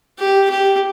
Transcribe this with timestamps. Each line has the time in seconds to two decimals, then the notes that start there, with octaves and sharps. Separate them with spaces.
0.19 G4
0.50 G4